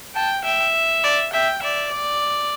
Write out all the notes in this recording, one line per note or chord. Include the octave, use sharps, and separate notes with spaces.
G5 A5
E5 G5
D5
E5 G5
D5 E5
D5